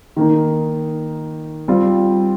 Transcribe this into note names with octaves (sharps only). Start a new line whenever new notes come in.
D#3 A#3 D#4
G3 C4 F4